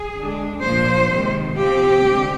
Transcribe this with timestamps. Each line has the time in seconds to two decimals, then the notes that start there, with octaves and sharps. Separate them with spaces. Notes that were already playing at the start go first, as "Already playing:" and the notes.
Already playing: G#4
0.16 D3 G#3 D4
0.63 A#2 F3 A#3 D4 C5
1.11 C3 D#3 G#3
1.57 C3 F3 C4 G4
2.03 D3 G#3 C4